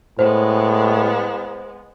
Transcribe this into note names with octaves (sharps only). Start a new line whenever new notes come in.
A2 G#3 B3 C5